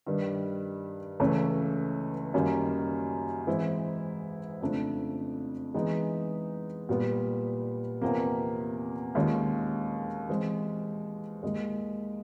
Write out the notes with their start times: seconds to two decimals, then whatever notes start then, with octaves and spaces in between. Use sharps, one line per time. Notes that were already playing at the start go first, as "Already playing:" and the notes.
0.06 G2 D#3 G3
1.20 C#2 C#3 E3 A3 C#4
2.34 F#2 D#3 G3 A#3 C#4
3.47 G#2 E3 G#3 C4 E4
4.61 F2 C#3 F3 A3 D4
5.74 E3 G#3 B3 D#4 G#4
6.89 A#2 G3 B3
8.01 E2 C3 F3 A#3
9.15 D#2 D#3 G#3 C#4 F4
10.29 E3 G#3 C4
11.43 D#2 D#3 G#3